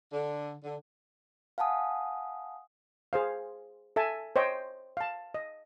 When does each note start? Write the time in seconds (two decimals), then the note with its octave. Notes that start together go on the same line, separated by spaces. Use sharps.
0.13 D3
0.64 D3
1.58 F5 F#5 G#5 A5 D#6
3.13 G#4 C5 F5
3.96 A4 E5 G#5 A5
4.36 C5 C#5 D#5 G5
4.97 F5 A5
5.34 D#5